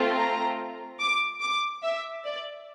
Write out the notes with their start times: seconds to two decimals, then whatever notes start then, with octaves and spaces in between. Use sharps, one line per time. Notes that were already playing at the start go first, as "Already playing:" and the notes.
Already playing: A3 C4 F4
0.15 A#5
0.99 D6
1.41 D6
1.83 E5
2.25 D5